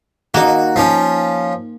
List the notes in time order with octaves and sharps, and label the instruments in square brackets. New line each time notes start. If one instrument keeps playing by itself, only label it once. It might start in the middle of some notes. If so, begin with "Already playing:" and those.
[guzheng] A#3 D#4 [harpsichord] F#4
[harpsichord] F3 C#4